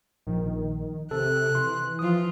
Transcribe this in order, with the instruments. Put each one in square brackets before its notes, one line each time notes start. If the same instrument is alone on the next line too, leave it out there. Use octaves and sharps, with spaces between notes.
[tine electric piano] A#1 [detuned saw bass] D#3
[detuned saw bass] C3 [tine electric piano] A4 [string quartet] F#6
[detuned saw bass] E3 [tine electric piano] C6
[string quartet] F3 F4 [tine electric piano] D#6